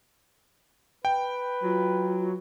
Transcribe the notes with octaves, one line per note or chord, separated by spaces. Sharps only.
B4 G5
F#3 F4